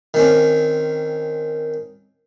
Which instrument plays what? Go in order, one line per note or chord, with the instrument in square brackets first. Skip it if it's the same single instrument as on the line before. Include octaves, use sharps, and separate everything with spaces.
[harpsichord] D#3 C4 C#4